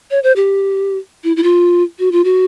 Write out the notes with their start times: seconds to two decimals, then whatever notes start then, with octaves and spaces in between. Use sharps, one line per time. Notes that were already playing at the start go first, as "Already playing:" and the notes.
0.11 C#5
0.23 C5
0.36 G4
1.24 E4
1.36 E4
1.43 F4
1.99 F#4
2.12 F4
2.24 F#4